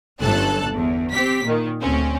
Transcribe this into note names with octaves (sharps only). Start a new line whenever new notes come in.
G1 F#2 A4 A5 F#6
E2
C4 G4 B6
A#2 D#3
D2 C4 C#4